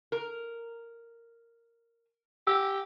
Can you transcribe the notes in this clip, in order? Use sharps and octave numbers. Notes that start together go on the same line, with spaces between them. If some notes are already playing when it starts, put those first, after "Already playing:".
A#4
G4 E6